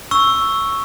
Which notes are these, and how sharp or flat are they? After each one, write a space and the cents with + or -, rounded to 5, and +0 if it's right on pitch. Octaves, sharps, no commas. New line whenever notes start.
C#6 +0 E6 +0